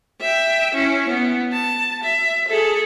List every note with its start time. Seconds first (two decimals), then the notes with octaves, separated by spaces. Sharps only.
0.21 E5 G5
0.74 C#4 E4
1.09 B3
1.52 A5
2.03 E5
2.48 G#4 A4